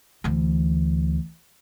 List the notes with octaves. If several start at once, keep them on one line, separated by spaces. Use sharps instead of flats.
D2 E3